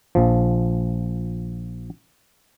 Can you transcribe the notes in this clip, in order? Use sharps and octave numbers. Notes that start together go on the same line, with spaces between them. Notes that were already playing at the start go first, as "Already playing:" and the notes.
A#1 F3